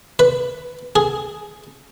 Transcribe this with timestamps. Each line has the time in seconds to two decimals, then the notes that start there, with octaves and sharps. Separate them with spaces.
0.19 B4
0.96 G#4